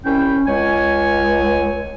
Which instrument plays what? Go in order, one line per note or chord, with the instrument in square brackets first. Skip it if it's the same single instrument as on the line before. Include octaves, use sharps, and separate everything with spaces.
[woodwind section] C2 E4 G5 [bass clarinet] C#4
[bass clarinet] C#2 [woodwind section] C#5 G#5